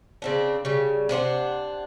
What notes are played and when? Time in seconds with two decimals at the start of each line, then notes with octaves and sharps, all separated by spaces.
0.22 C#3 C4 D4
0.65 C#3 G3
1.09 C3 D4 C5 F#5